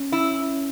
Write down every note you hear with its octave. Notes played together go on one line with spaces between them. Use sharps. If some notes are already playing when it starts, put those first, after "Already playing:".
Already playing: C#4
E4